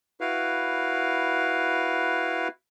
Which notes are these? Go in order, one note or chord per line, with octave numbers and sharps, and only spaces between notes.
E4 F#4 B4 F5